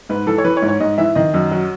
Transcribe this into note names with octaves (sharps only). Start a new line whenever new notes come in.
G#2 B4
E3 A4
C#5
E3 B4
C#5
G#2
C#5
G#2 D#5
E3 E5
D#3 D#5
F#2
F#3